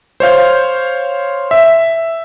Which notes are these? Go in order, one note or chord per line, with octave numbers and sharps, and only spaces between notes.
C5 C#5 F5 G6
E5